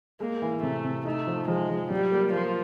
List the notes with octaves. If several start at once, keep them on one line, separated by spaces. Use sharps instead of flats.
G#3 A#3
E3
C3 A3
C3
A3 D#4
F3
F3 G#3
F3
F#3 G3
A#3
F3 A#3